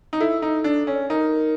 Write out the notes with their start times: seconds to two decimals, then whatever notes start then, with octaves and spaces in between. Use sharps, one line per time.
0.13 D#4
0.20 E4 A4
0.42 D#4
0.64 D4
0.87 C#4
1.10 D#4 A#4